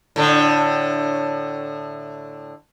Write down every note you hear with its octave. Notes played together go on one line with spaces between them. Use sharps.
A2 D3